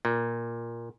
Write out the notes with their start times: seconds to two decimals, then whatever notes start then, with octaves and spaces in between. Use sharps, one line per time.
0.05 A#2